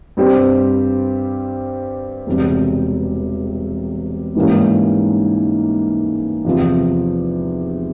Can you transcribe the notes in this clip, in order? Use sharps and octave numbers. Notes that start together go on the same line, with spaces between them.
G2 G3 C4 G4 C5
E1 E2 C3 G3
G#2 E3 G3 A#3 C#4
E2 C3 F3